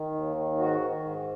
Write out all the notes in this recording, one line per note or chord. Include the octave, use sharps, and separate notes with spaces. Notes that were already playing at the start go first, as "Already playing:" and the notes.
Already playing: D#3
D#2
D#3
G#2 F#4
D#3
G#2